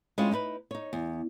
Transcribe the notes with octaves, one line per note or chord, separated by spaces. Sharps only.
G#3 C4 C#4 E4 F4
D#4 E4 A4 B4
D#4 C#5
E2